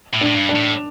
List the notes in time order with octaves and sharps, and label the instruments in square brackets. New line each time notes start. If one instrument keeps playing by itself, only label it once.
[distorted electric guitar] A2
[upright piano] D4
[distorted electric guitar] A2
G2
[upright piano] D4
[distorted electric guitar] A2